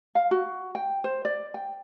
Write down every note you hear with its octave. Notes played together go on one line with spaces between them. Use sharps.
F5
F#4
G5
C5
D5
G5